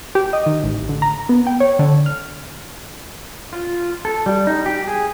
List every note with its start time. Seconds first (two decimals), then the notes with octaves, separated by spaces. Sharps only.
0.15 G4
0.33 D#5
0.46 D#3
0.64 A1
0.89 D3
1.02 A#5
1.29 B3
1.47 G5
1.60 C#5
1.79 D3
2.06 F6
3.53 F4
4.05 A4
4.26 G3
4.47 D#4
4.66 G4
4.88 G#4